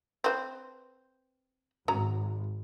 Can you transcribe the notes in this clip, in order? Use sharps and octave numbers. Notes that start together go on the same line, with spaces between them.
C4 B4 C5
G#1 F#3 C#4 A#5